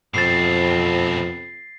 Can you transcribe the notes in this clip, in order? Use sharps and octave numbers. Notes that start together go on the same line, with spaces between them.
F2 B2 C4 A6 C7